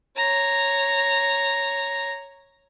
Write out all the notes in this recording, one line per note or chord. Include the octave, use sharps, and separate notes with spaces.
C#5 A#5